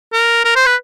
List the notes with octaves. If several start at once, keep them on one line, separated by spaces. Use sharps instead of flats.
A#4
A#4
C5
B4